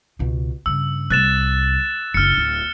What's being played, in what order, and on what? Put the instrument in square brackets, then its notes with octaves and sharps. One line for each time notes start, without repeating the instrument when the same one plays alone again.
[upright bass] C#2 B2
[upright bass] G2 C#3 [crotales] E6
[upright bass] C2 [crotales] F#6 A6 E7
[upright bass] F#1 D4 [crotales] F6 C#7
[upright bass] D1